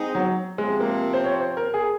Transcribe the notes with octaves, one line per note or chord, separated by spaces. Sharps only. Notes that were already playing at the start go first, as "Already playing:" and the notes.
Already playing: G#3 C4 D#4
F#3
C3 F3 G#3 C4
A#3
C5
C#5
C5
A#4
G#4